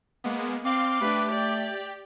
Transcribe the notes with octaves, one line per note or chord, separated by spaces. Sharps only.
G#3 A#3 B3
C4 F5 C6 D6
A3 D4 G4 B4
D5 G5